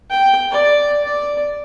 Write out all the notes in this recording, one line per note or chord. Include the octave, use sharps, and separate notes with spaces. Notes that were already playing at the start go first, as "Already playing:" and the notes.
G5
D5
D5